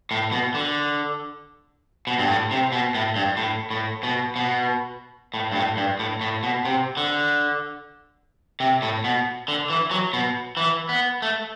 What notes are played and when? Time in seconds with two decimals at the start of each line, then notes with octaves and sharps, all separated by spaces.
0.11 A2
0.32 B2
0.55 D3
2.07 B2
2.18 G2
2.29 A2
2.51 C3
2.72 B2
2.95 A2
3.16 G2
3.37 A2
3.71 A2
4.03 B2
4.36 B2
5.34 A2
5.52 G2
5.55 A2
5.77 G2
5.99 A2
6.21 A2
6.43 B2
6.65 C3
6.97 D3
8.60 C3
8.82 A2
9.04 B2
9.48 D3
9.70 E3
9.91 F#3
10.13 B2
10.57 E3
10.89 B3
11.22 A3